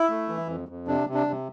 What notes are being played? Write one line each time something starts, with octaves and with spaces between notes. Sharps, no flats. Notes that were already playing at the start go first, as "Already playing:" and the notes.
Already playing: E4
A3
E3
F2
F2
C3 D4
C3
D4
C3